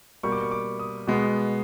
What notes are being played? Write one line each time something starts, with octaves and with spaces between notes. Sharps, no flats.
B2 G3 A#3 C#6
D6
C#6
D6
D#6
B2 G#3 B3